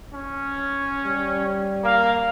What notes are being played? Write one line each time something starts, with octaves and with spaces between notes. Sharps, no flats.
C#4
G3
A#3 F5